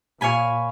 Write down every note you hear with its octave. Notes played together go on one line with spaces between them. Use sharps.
A#2 C#5 F5 G#5 B5